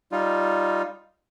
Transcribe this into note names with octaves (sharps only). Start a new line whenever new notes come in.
G3 D#4 F4